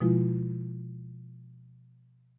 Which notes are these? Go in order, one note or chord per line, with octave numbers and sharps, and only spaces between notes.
B2 F3 G#3 E4 F4